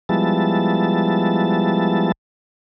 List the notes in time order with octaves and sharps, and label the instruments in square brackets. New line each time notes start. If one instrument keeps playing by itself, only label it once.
[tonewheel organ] F3 G3 G#3 B3 E4 A5